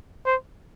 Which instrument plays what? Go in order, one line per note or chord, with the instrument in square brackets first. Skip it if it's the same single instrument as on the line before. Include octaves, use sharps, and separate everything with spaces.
[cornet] C5